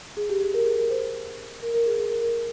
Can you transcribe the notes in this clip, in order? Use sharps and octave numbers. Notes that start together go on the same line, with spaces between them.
G#4
G4
G#4
A#4
G#4
A#4
C5
A#4
A#4
G#4
G#4
A#4
A#4